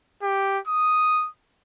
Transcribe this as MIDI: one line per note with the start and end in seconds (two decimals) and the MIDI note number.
0.22 0.59 67
0.67 1.28 87